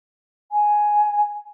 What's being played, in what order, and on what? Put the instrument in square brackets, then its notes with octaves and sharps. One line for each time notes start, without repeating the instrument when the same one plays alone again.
[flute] G#5